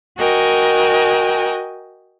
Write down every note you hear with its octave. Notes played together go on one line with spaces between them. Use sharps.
F#4 A#4 D#5 G5 G#5